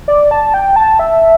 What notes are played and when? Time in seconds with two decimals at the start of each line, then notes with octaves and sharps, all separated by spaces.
0.08 D5
0.31 A5
0.54 G5
0.76 A5
0.99 E5